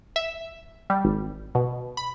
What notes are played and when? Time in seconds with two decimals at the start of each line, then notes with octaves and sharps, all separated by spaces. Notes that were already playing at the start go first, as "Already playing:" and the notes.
0.16 E5
0.90 G3
1.05 G#1
1.55 B2
1.97 B5